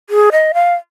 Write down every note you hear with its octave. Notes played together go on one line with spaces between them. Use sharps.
G#4
D#5
F5